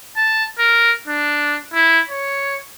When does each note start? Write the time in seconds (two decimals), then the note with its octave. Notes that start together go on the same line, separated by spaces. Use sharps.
0.17 A5
0.59 A#4
1.08 D4
1.73 E4
2.09 C#5